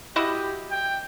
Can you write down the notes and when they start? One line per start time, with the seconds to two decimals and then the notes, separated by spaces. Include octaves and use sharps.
0.16 E4 F#4 G4 D#5
0.71 G5